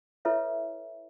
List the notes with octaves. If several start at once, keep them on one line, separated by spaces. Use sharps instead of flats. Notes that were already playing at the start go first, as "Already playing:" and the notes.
E4 A4 B4 C#5 E5